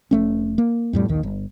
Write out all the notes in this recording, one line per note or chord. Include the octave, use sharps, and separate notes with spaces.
F1 A3 C#4
A#3
F2 A2 G3
A#1 D#2 D#3
G1